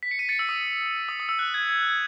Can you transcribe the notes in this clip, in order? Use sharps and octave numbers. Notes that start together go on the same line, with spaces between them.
B6
C#7
B6 D#7
A6 C#7
E6
D#6
D#6
D#6
E6
F#6
G#6
G#6
F#6
G#6